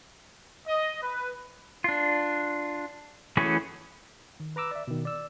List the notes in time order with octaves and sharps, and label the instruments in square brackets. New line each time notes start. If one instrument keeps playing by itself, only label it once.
[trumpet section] D#5
B4
[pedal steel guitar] D4 F4
E3 A3 C#4 F#4 G#4
[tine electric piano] D#3
B4 A#5 D6 E6
D5 E5
B2 D#3
D5 E6